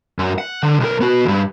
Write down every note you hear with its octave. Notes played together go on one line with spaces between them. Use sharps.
F#2
F#5
D3
B1 A#4
B3 F#4
D2 G2